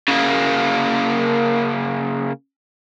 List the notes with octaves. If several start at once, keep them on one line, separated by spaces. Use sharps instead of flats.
C#3 A#3